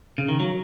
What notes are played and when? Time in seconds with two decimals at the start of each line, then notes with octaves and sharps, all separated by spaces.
0.18 C#3
0.29 D#3
0.40 F#3